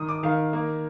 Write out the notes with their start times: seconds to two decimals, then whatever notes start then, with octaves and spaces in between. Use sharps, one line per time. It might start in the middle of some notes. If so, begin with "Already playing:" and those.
Already playing: D#3 D#6
0.09 D6
0.23 D#3 F5
0.53 A#3